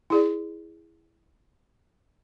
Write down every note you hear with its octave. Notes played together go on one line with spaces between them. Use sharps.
E4 G#4 D5